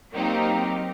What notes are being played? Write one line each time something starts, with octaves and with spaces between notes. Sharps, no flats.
F#3 A#3 C4 D#4 G4